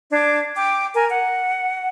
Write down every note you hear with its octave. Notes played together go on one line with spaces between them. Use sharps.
D4 D6 G#6
G5 D6
A#4 G#5
F#5